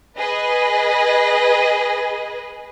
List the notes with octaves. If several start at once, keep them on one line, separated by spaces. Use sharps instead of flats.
G#4 B4 D#5